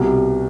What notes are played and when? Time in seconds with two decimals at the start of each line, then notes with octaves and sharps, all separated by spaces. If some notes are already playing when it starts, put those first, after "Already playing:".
Already playing: C2 B2 G3